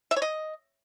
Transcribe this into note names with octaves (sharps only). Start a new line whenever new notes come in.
E5
C#5
D#5